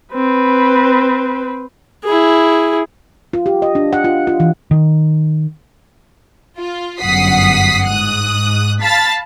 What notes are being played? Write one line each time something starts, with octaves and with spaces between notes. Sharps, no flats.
C4 B4
E4 G#4
F4
G4
D#5
D4
F#5
F4
F4
E3
D#3
F4
G1 F#2 F#5 D#6 B6 C7
G#2 D#6 F#6
F5 A5 B5 A6 B6